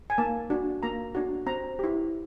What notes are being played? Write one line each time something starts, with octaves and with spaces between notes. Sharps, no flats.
G#5
A#3 A5
D4 F#4
A#3 A#5
D4 F#4
C4 A#5
E4 G4